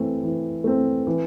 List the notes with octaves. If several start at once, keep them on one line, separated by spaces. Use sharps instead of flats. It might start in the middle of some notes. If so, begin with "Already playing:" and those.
Already playing: E3 A3 C4
E3
A3 C4
E3